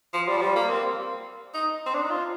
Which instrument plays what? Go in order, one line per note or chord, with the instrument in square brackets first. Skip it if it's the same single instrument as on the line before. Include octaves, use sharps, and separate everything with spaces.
[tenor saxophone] F3
G3
F3
G3
A#3
C4
D#4
C4
D4
D#4
F4